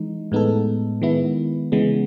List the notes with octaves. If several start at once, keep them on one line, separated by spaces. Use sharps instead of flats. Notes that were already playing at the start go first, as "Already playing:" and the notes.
Already playing: E3 G#3 D#4
A2 G#3 B3 D#4 A4
D#3 G#3 B3 E4
C#3 E3 G#3 B3